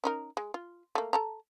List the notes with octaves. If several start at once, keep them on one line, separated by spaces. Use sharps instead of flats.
C#4 D#4 A#4
G#3
F4
A3 A#3
A4 A5 A#5